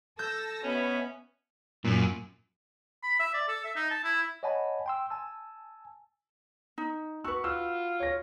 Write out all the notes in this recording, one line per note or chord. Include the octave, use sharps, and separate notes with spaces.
A4 A5 E6 G6 A#6
B2 B3 C#4 E5 B5
F#2 A#2
B5
E5
D5
A4
E5
D#4
A5
E4
C#5 D#5 F#5 G#5 A5 B5
G5 C6 E6
G#5 A5 E6
D#4
F#4 B4 C#6 E6
F4 E6
C#5 A#6